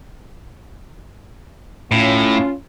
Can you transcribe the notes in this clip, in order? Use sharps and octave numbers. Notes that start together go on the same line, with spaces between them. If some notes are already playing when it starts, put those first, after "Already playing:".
A2 C#4 F4